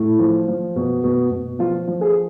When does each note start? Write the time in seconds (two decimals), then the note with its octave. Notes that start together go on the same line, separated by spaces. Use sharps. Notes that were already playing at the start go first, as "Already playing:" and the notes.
Already playing: A2
0.19 F3
0.48 F3
0.76 B2
1.04 B2
1.31 B2
1.59 F3 F4
1.87 F3
2.01 G#4